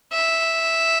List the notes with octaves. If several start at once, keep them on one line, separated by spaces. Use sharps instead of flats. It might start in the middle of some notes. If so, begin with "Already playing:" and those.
E5